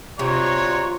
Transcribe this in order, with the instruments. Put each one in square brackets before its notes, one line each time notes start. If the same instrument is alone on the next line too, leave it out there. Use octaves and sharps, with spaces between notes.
[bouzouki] C3 [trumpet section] D4 F#4 C#5 [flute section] F4 A#5 C6